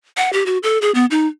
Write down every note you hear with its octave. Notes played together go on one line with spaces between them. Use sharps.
F#5
G4
F#4
A4
G#4
B3
D#4